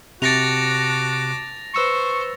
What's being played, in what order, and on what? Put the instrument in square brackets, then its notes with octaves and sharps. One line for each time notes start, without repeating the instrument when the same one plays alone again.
[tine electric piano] C3 C#7 [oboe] F#4 [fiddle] A5 D6 [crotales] A6 A#6 F7
[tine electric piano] B4 E6 C#7 [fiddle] C5 [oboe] C#6